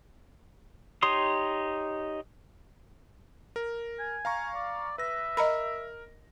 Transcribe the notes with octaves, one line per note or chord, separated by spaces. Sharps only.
D#4 G4 C#5 C6 D#6
A#4
G#5
F5 A#5 C#6
D5
B4 E5 A#6
A#4 D#5 A#5 B5